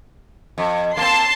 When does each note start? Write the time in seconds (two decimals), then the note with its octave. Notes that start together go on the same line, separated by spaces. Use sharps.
0.58 F2
0.97 A#3 C4 A5 C6